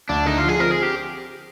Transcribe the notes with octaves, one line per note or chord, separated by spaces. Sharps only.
D2 D4
D3 D#4
F4
F3
G#4
C4 A#4
G#4
G4